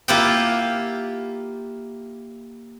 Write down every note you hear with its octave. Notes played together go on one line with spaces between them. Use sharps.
A#3 E4 F4 G4 F#5 G5